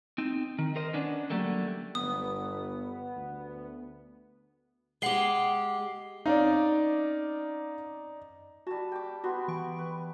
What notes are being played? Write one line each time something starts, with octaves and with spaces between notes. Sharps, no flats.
C4 D#4
D#3
A#4 C5 D#5
B3 C#4 D4
D3 F#3 G3 A3 A#3
G1 B3 D#6
D2
G#3 G4 F#5 C7 G7
C4 C#4 D#4 D5 F5
G3 F#4 A5
G5 D6
B3 F#4 C6
E3 C#6 D7
B4